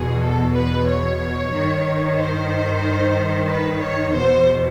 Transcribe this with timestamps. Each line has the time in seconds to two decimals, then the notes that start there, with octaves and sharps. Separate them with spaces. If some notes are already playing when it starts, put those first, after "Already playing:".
Already playing: E2 B2 G#4
0.23 A4
0.55 B4
0.88 C#5
1.53 G2 D#3
2.18 C5
3.49 B4
3.82 C#5
4.15 E2 B2 C5